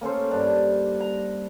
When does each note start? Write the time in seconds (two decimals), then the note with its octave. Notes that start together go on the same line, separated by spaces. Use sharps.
0.01 A#3 C#4 A4 C5
0.31 G2 D4 A#4 A#5
1.00 A#5